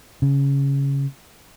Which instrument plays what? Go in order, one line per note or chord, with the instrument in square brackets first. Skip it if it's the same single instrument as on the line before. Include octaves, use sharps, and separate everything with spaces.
[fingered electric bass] C#3